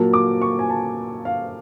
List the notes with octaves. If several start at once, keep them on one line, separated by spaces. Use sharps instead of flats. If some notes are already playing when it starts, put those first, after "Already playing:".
Already playing: A#2 F#3 A#3 A5
D6
C#6
G#5
A5
F5